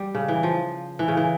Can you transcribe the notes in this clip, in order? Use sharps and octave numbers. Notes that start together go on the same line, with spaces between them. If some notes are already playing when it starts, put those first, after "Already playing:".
Already playing: G3
C#3
E3
F3
E3
C#3
E3